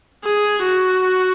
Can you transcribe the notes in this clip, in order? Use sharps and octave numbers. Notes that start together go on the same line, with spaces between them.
G#4
F#4